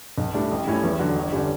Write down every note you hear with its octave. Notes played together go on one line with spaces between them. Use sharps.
B1
A2 G3 D4
A1
A2 G3 C#4 E4
E2
D3 F#3
G1
D3 G3 C#4